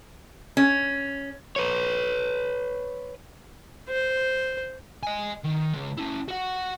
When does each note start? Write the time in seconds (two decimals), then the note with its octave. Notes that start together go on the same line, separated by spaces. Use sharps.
0.57 C#4
1.56 B4 C#5
3.89 C5
5.03 D#5 G#5
5.45 D#3
5.74 C#3 G#3
5.97 C#4 E4
6.28 F#4 F#5